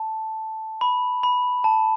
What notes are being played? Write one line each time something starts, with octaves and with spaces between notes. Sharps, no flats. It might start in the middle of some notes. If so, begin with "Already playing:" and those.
Already playing: A5
B5
B5
A5